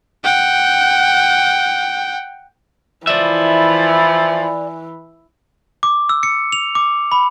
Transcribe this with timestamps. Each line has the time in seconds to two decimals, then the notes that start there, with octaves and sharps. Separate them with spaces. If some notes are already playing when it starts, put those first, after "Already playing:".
0.24 F#5 G5
3.07 E3 F3 E4 D5 E5
5.83 D6
6.09 E6
6.23 C#7
6.52 F7
6.75 D6
7.12 B5